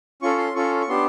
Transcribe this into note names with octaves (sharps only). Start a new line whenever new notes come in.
C#4 F4 A4 C#6
C6
C#4 F4 A4 C#6
C#6
B3 D4 G4 C6